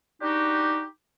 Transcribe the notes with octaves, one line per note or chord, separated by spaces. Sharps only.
D4 D#4 F#4 G4